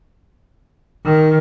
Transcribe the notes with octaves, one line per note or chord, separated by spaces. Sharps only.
D#3